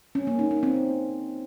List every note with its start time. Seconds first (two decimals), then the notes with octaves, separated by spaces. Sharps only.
0.15 C#4
0.27 A#3
0.39 D#4
0.51 D#4
0.63 C4